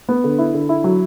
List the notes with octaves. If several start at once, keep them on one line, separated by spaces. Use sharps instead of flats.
B3
D3
E4
D3
E4
F#3